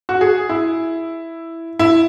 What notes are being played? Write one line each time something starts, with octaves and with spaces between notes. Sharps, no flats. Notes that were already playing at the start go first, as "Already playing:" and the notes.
F#4
G#4
E4
E4